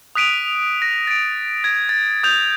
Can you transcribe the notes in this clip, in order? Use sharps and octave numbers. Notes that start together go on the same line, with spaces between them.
D#6 F#6 B6 D7 D#7 F7
A#6
A6 D7
G#6 A#6
A6
D#6 G6 F7